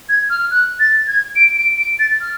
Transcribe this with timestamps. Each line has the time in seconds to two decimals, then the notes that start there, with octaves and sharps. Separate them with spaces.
0.09 G#6
0.30 F6
0.51 F#6
0.80 A6
1.07 G#6
1.36 D7
1.57 D7
1.78 D7
1.99 A6
2.21 F6